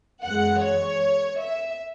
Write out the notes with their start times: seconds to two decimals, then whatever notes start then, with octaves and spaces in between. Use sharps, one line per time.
0.23 F#2 E3 G#3 F#5
0.62 C#5
1.41 E5